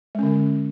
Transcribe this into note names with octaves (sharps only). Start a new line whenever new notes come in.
D3 G#3 C#4